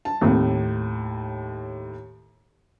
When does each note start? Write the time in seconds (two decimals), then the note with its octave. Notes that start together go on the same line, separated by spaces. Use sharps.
0.05 A5
0.21 D#2 A2 A3 A#3 C4